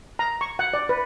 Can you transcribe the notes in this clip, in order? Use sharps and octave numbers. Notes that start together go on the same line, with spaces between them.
A#5
C#6
F#5
D5
B4